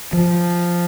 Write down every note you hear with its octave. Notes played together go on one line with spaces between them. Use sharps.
F3